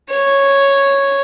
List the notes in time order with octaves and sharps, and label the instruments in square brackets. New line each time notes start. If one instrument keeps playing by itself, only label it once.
[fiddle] C#5